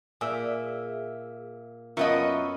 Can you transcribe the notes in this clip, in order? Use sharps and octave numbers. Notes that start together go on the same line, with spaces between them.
A#2 G#4 E5
F#2 B3 F4 A#4 D#5 E5 B5 C#6